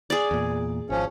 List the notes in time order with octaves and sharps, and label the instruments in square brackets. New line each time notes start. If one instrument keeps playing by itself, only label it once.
[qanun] G#4 D5
[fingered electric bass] E2 A#2
[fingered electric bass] G#1 [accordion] F3 C#4